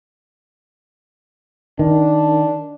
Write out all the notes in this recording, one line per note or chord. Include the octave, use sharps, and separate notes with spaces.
D#3 D4